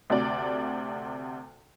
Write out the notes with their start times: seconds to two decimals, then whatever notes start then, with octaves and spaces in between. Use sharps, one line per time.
0.10 D2 C3 D5